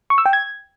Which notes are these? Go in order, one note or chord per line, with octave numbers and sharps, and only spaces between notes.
C#6
E6
G5
G#6